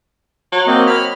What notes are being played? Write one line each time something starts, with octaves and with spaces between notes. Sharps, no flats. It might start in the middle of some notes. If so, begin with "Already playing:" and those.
F#3
A#3 C4 D#5
B5 F6